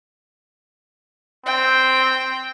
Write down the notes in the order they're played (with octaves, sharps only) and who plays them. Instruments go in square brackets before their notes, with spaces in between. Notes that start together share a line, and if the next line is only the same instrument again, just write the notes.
[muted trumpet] C4 [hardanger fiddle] G5